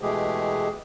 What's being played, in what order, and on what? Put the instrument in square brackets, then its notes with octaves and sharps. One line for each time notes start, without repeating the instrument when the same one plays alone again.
[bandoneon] B2 E3 G#3 A3 G4 G#4